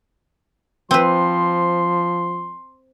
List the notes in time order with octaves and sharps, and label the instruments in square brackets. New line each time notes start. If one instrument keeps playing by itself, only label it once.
[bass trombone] F3 [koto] C4 B4 [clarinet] C6